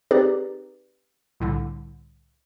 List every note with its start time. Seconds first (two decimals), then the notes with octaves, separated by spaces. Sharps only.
0.11 C4 D#4 G4 G#4 B4 D5
1.40 C2 A2 D3